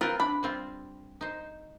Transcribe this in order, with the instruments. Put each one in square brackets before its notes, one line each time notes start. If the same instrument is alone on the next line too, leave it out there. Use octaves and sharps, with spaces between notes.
[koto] C4 B4 [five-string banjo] F4 A#4
[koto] D4 [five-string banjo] B5
[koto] G3 C4 F4
D#4 C5